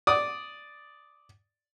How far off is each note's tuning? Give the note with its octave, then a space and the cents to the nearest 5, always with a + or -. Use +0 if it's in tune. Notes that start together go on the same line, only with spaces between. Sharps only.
D5 +0 D#6 +0